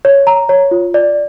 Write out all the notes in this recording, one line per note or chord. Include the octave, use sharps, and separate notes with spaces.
C#5
A#5
C#5
F4
D5